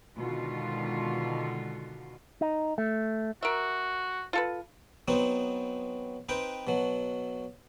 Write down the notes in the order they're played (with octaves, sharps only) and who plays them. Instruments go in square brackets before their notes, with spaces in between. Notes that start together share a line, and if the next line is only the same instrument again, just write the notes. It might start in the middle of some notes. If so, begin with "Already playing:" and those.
[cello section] B2 D3 D#3 G#3 F4 F#4
[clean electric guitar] D#4
A3
[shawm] F#4 [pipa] A#4 E5
[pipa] F4 A4 B4
[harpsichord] F#3 B3 C4 D#4
C4 D#4 B4 G5
B2 F#3